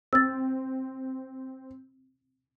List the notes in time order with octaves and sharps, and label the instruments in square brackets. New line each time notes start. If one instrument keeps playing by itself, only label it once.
[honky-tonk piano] C4 [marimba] E6 A6